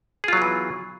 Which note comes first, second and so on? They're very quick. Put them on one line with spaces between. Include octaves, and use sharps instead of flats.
G#4 F4 F#3 B3 E3